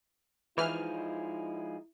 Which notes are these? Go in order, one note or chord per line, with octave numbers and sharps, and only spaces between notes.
E3 F3 G#3 D#4 E4 F6